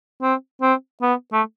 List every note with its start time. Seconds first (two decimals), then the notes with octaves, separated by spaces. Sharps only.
0.22 C4
0.62 C4
1.02 B3
1.33 A3